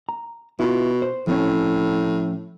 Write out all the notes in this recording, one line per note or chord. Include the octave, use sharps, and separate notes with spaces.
A#5
B2 E4 F4
C5
A2 F3 C4 C#4